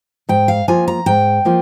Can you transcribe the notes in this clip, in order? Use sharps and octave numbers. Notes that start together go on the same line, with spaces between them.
G#2 G5
F5
F3 A#3 F4 G#5
A#5
G#2 G5
F3 A#3 F4